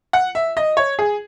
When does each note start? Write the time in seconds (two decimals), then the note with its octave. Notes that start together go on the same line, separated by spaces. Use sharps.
0.13 F#5
0.35 E5
0.57 D#5
0.77 C#5
0.99 G#4